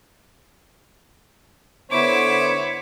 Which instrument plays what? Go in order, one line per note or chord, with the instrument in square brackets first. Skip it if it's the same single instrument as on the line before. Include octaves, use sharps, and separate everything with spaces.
[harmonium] D3 B3 C5 [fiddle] E4 [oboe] C#5 [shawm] D6